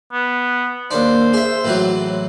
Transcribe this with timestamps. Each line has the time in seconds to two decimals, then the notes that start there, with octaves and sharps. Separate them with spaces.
0.12 B3
0.91 D#2 D4 C5
1.33 G#4 E5
1.65 A2 E3 F#3